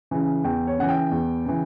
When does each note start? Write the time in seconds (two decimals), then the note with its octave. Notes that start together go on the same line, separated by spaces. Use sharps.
0.11 C#3 E3
0.44 E2 G5
0.67 C#5
0.78 C#3 E3 F#5
0.89 G5
1.11 E2
1.45 C#3 E3